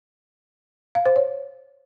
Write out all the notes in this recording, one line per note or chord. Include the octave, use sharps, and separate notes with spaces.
F5
C5
C#5